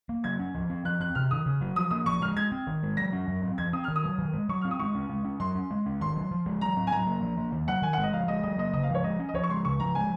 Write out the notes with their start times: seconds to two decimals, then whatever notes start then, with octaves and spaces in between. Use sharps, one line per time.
0.09 A#3
0.24 F#3 G#6
0.39 C#4
0.55 F3
0.70 C4
0.85 F3 F#6
1.00 C4 F#6
1.15 C3 F6
1.31 D#3 D#6
1.46 C#3
1.61 F#3
1.76 F3 D#6
1.91 A#3 D#6
2.06 F3 C#6
2.21 G#3 F6
2.36 G#3 G#6
2.52 C4
2.67 D#3
2.83 G#3
2.97 F#3 A#6
3.13 C#4
3.28 F#3
3.43 C4
3.58 F3 G#6
3.73 C4 D#6
3.84 D#3 F6
3.96 D#6
4.04 F#3
4.18 D#3
4.33 G#3
4.49 F#3 C#6
4.61 C4 F6
4.71 D#6
4.79 G#3 C#6
4.95 C#4
5.10 G#3
5.25 C#4
5.40 F#3 C6
5.55 C#4
5.71 G#3
5.86 C#4
6.01 D#3 C6
6.16 F#3
6.31 F3
6.46 G#3
6.61 F#3 A#5
6.77 C4
6.87 G#5
6.92 F#3 A#5
7.07 A#3
7.22 F3
7.37 A#3
7.52 D#3
7.68 F#3 F#5
7.82 D#3 G#5
7.93 G#3 F#5
8.03 D#5
8.13 F3 F5
8.28 G#3 D#5
8.43 F#3 D#5
8.58 A#3 D#5
8.73 C#3 D#5
8.83 F5
8.89 F3
8.95 C#5
9.04 G#3 D#5
9.19 C#4
9.29 D#5
9.34 F3 C#5
9.44 C#6
9.49 G#3 C6
9.65 C#3 C#6
9.80 F3 A#5
9.95 G#3 G#5